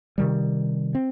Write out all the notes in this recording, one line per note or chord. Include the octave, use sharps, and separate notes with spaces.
C3 D#3 G3
C4